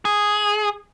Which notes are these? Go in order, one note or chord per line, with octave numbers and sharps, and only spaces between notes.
G#4